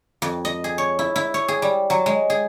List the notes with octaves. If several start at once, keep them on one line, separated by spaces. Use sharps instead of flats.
F2
D#5
G#4
C#5
E4
E4
C#5
G#4
G3
F#3
G#3
G#4